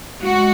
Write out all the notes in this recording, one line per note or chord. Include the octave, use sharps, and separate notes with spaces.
G#3 F#4